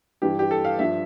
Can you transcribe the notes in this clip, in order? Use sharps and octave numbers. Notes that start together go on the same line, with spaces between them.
G2 E3 G4
G4
A4
F5
G2 F3 E5